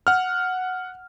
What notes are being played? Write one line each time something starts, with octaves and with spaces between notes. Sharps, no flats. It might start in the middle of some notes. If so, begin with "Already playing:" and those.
F#5 F6